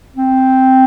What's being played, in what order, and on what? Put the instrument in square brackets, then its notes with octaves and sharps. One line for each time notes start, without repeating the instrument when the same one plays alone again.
[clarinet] C4